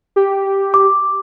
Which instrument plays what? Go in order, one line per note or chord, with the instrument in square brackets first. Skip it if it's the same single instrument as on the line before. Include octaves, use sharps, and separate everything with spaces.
[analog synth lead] G4
[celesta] D6